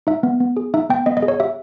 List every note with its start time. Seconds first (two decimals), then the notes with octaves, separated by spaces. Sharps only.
0.07 D#4 E5
0.23 B3
0.40 B3
0.57 G#4
0.74 D#4 E5
0.90 B3 G5
1.06 B3 D#5
1.17 D#5
1.22 G#4
1.28 C#5
1.40 G4 E5